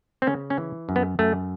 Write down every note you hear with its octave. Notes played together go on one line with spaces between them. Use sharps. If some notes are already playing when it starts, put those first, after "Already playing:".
C4
C#3 C#4
C#4
E3
F#2
B3
F#2 A3